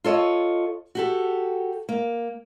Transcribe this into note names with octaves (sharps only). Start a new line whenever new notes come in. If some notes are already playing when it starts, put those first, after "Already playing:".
F4 A4 C#5 D#5
F#4 G4 A4
A#3